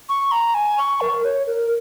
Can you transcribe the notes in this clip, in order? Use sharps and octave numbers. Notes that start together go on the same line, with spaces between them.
C#6
A#5
G#5
C#6
A#4
C#5
A#4